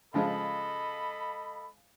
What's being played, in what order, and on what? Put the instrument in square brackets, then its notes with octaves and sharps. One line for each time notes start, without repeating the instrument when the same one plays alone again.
[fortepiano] C#3 F3 G#3 [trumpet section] A4 D#5 B5